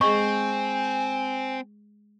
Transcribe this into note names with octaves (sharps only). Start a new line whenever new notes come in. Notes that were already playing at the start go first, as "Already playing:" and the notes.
G#3 C4 G#4 D#5 G#5 C#6